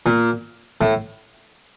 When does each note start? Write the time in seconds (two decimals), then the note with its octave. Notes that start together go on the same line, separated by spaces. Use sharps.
0.06 A#2
0.81 A2